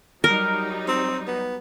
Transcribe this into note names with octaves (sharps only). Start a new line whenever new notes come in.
F#3 G3 D#4 A#4
C4
B3